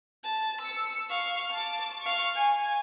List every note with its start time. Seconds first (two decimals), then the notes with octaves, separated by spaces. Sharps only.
0.24 A5
0.61 E6 C#7
1.10 F5 C#6
1.52 A5 D6
2.01 F5 C#6
2.35 G#5